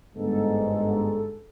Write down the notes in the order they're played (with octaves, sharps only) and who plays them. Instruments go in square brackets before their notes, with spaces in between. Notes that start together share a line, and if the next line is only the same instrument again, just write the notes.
[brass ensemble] G1 G#2 [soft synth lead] A4